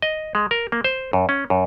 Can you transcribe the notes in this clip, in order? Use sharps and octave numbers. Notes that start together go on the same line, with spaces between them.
D#5
G#3
A#4
A#3
C5
F#2
C#4
F#2